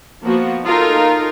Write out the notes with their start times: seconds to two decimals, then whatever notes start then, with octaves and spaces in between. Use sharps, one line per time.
0.24 F3 A#3 B3 F#4
0.65 D#4 F4 A4 A#4